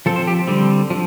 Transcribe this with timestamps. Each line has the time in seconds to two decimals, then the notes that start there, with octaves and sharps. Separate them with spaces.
0.06 F3 C4 A4
0.16 C5
0.27 G4
0.47 D3 G3 C4
0.90 F3